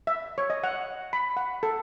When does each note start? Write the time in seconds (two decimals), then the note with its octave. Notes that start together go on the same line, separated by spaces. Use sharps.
0.07 E5
0.38 C#5
0.50 D#5
0.63 F#5
1.13 B5
1.37 F#5
1.63 A4